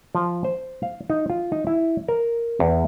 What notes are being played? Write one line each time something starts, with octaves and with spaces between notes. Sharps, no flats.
F3
C5
F5
D#4
F4
D#4
E4
A#4
E2